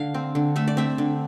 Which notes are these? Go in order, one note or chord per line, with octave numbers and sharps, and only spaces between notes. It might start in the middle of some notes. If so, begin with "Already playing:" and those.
Already playing: D3 F5
C4
D3
A3 E5
D5
C4 E5
D3